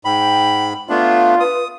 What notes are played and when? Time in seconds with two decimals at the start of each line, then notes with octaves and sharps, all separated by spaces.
0.05 G#2 G5 B5
0.89 A3 B3 D4 F4 F5
1.40 B4 D#6